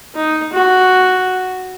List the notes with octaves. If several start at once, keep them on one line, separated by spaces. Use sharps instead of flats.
D#4
F#4